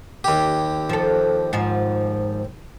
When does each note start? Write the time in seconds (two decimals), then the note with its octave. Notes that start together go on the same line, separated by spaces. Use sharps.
0.24 D#2 G4
0.89 F3 A4
1.53 G#2 F3 F4